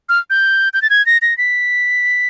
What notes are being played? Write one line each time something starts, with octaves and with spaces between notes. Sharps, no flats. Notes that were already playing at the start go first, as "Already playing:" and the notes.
F6
G6
G6
A6
G#6
A#6
A#6
B6